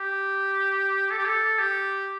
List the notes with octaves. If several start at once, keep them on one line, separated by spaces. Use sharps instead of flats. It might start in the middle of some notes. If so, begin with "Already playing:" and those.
Already playing: G4
A4
G4
A4
G4